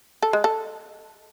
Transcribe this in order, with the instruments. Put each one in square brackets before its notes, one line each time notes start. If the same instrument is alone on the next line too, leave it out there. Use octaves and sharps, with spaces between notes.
[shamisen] A4
G#3
A4